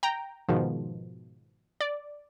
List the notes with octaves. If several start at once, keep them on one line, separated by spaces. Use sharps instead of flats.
G5 A#5
G#2 B2 D#3 F3
D5